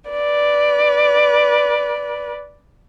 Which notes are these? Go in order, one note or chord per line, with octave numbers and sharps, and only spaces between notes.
B4 D5